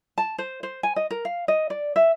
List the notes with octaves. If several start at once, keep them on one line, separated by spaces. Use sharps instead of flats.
A5
C5
C5
G#5
D#5
A#4
F5
D#5
D5
E5